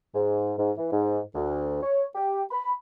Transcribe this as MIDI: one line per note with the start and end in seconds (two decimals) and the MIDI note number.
0.15 0.54 44
0.59 0.71 44
0.78 0.88 52
0.92 1.20 44
1.35 1.80 38
1.83 2.04 73
2.15 2.44 67
2.51 2.73 83